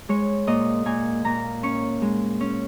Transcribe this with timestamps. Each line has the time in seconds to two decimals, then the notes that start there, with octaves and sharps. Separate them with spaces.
0.09 G#3 C#5
0.47 A#2 D#5
0.86 A#2 G#5
1.25 A#2 A#5
1.63 C#4 C#6
2.02 G#3
2.40 C#4